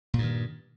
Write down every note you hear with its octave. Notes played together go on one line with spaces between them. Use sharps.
G2 A#2 D#3